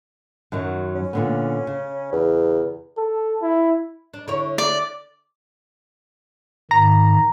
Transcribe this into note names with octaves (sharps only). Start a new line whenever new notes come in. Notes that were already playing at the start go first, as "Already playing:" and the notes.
F#2 D#3 F#3
C#4
A#2 D3 B3
C#3
E2
A4
E4
D4
D3 E4 C#5
D5
G#2 D#3 A#5